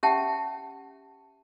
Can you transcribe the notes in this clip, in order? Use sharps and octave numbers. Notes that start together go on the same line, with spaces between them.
C#4 G4 E5 F#5 G5 A5